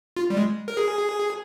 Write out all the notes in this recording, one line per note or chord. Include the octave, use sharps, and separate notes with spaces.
F4
G3
G#3
A#4
G#4